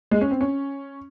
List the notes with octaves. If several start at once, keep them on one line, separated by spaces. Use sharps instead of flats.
G#3
C#4
C4
C#4